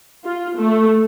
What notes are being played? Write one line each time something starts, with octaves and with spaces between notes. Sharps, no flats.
F4
A3